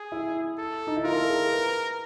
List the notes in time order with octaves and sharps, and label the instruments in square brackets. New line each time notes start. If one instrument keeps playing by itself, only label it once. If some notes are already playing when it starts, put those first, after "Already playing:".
Already playing: [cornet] G#4
[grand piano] E4
[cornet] A4
[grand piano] D#4
E4
[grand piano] F4 [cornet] A#4
[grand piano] A4
G#4
B4